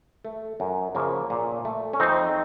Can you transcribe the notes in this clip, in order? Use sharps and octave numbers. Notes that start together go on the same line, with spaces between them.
A3
F#2
C#3 F3 A#3
A#2
A3
C#4
F2 C4 D#4